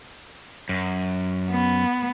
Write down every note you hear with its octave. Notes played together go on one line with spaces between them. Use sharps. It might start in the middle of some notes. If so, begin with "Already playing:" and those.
F#2
B3